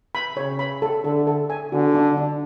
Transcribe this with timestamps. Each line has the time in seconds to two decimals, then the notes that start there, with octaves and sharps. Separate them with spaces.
0.15 B5
0.37 C#3 C#5
0.59 B5
0.82 A4
1.04 D3 A4
1.27 A4
1.50 G#5
1.72 D3 F#4
1.94 D4
2.17 D4